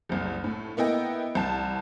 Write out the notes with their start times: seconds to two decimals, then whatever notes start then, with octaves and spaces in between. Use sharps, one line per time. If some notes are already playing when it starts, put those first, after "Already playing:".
0.09 F#1 C2
0.44 A2
0.77 A#3 B3 E4 D#5 G5
1.35 C2 A5